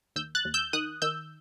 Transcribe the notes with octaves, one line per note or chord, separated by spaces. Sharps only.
D#2 E6 G6
F#6 A6
D#2
E6 G6
D#3 D#6 F#6
D#3 E6 G6